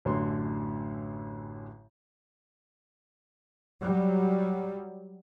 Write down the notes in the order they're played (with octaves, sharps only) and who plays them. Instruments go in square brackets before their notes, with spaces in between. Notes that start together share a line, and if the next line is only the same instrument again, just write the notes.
[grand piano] A1 F#2 A2 D3 C6
[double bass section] F#3 G3